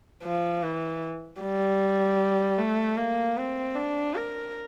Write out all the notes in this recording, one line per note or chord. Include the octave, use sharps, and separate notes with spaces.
F3
E3
G3
A3
A#3
C4
D4
A#4